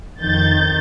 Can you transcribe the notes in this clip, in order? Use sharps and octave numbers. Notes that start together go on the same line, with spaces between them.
F2 D#3 G6 A6